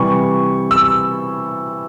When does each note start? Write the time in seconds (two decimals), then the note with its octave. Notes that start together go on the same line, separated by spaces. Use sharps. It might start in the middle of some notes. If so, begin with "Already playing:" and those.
Already playing: C3 E3 G3 C#6
0.71 E6